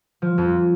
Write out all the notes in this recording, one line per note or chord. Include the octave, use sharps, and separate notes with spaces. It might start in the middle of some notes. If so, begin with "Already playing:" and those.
F3
F2